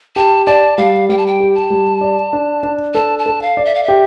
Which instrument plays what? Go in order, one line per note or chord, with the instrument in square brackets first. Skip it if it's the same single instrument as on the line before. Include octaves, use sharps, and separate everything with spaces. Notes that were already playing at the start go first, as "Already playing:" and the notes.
[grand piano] G4 [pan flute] A5
[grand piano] D5 [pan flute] A5
[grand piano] G3 [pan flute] F5
[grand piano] G3 [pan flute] G5
[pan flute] A5
G5
[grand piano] G4
[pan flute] A5
[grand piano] G3
D5
D4
D4
[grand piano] A4 [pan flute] A5
[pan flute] A5
[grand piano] A4
[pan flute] F5
[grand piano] D5
[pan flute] E5
F5
E5
[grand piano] G4